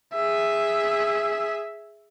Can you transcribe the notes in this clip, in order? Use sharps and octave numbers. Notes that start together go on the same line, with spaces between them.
G#4 E5